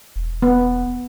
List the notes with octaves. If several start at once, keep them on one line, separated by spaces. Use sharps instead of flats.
E1
B3